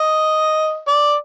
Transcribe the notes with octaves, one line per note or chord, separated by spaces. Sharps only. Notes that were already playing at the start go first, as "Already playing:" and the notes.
Already playing: D#5
D5